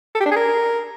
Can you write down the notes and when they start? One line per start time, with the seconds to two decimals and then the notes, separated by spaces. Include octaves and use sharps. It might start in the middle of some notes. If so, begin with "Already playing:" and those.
0.15 A4
0.20 G4
0.26 D4
0.31 G#4
0.36 A#4